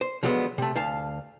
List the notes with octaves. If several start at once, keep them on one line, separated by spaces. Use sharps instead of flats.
C5
D3 F3 F#3 G#3 B3
C3 A3
D2 F5 A5